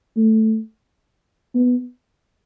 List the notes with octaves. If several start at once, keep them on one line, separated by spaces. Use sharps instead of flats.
A3
B3